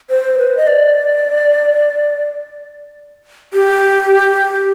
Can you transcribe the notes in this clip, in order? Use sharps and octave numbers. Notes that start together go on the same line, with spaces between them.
C5
B4
D#5
D5
G4